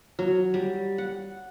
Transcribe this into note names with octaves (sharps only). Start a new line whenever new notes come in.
F#3
G3
F#5